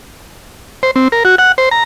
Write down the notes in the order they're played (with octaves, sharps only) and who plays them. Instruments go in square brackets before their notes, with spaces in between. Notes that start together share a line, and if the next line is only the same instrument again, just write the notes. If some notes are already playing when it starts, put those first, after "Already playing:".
[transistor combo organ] C5
C4
A#4
F#4
F#5
C5
A#5